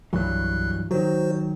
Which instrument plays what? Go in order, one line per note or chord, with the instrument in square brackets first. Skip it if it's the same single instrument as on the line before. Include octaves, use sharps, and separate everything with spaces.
[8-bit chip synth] C2 F#6 [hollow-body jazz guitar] G2 E3 F#3
[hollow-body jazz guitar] D#3 F#3 [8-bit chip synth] F#4 C5